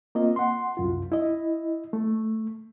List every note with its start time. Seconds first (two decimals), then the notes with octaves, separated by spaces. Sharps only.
0.15 A#3 C4 F4 D#5
0.36 F#5 C6
0.77 C2 F#2 F4
1.12 E4 D#5
1.93 A3